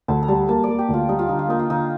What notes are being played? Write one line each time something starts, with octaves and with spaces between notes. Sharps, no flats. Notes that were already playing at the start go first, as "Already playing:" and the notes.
D2 A5
A#5
G3 A5
A#3 A5
D5
A#3
G4
D2 F4
G3 D#4
F4
D3 D#4
F4
A#3 D#4
F4
D3 D#4